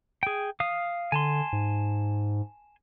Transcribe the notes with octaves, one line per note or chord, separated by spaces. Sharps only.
G#4 G5
F5 D#6
D3 G#5 A5 C6
G#2